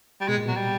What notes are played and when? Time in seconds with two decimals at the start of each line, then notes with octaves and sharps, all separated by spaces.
0.21 G3
0.28 B2 G#3
0.38 A#2
0.46 B2 F#3
0.56 G3